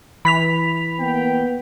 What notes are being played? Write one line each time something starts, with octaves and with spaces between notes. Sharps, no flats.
E3 B5 B6 F7
A#3 B3 G5